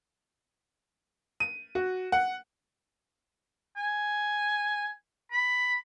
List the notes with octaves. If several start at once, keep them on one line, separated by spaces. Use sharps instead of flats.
D#7
F#4
F#5
G#5
B5